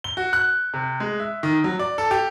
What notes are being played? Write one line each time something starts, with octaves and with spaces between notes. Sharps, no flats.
G7
F#4
F#6
C3
G#3
E5
D#3
F#3
D5
A4
G4